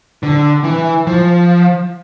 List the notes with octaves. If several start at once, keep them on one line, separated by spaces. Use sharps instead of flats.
D3
E3
F3